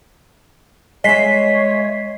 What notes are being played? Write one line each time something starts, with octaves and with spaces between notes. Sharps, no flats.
G#3 C#5 D#5 E5 B6 C7